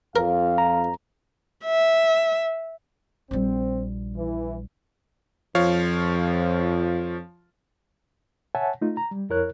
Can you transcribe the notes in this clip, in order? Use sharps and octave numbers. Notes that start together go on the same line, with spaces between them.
F2 A#4 F5
A#5
E5
A#1 G3 C4
E3
F2 F3 C#5 F5
C#5 E5 F#5 G#5 A5
A3 D#4 F4
A#5
G3
F2 E4 A#4 C#5 F#6